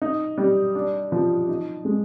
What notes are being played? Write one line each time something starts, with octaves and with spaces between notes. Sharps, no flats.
D#4
G3
D4
F3
D#4
G#3